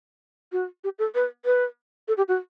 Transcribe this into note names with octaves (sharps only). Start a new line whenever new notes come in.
F#4
G4
A4
B4
B4
A4
G4
F#4